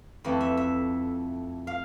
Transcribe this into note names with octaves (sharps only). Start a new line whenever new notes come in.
F2 E3 A3
E5
E5
F5